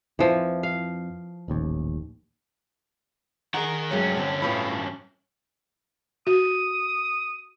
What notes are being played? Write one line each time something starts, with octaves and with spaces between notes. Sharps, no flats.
F2 E3 F3
F5
D#1 A1 D#2
D#3 G#4 A#4 F#5
G2 F#3 G#3 A3 C#4
D3 C4
A2 E4 F4 B4 B5
F#4 D#6